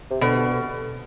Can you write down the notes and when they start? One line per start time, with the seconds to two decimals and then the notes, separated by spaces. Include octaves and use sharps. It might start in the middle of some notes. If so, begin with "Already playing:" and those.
0.11 C3
0.21 B2 D3